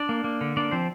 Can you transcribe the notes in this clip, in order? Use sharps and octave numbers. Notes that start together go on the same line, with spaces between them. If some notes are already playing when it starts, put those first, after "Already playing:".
Already playing: D4 D5
A#3
A#3
D3
A#3 D4 D5
F3 C4 C5